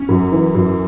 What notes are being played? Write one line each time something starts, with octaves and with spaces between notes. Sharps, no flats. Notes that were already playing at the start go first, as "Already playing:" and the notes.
Already playing: C#4
F#2
E3
F#2